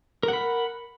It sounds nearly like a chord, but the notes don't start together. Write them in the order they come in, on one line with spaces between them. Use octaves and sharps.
A#4 F#5 B5